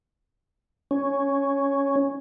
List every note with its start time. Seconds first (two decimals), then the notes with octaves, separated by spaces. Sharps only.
0.91 C#4